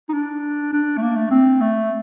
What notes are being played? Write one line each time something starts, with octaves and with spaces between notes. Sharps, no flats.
D#4
D4
D4
A3
A#3
A3
C4
A3